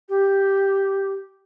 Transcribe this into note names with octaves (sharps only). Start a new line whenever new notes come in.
G4